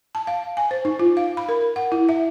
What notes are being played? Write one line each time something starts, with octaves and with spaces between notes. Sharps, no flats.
A5
F5
G#5
C5
D#4
F4
F5
B5
A#4
F#5
E4
E5